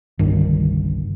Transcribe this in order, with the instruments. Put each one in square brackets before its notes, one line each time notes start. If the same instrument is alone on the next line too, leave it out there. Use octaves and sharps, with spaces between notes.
[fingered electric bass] G1 C2 G2 D#3